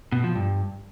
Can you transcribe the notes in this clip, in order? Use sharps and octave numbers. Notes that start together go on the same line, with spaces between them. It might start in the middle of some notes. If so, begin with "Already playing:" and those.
B2
F3
G2